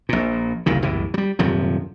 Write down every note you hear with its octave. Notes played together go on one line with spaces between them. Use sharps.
A#1 A#2
F#1 C2 A#2 D#3
F#1 C2 A2 E3
F#3 G3
D#1 F#2 C3 F3